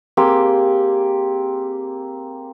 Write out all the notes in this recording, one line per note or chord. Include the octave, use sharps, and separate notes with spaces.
A#3 C4 G4 G#4